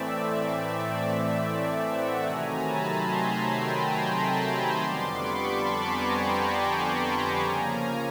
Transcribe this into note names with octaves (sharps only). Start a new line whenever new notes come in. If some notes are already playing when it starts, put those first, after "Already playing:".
Already playing: A2 E3 A3 C4 D5 E5
E5 F#5
C3 D#3 F#3 A3 G#5 A#5
A5 B5
A#5 C6
G#5 A#5
G5 A5
G#5 A#5
A5 B5
A#5 C6
F2 D3 G3 B3 C6 D6
B5 C#6
A5 B5
G#5 A#5
G5 A5
G#5 A#5
G#5 A#5
C#3 F3 A#3 C#4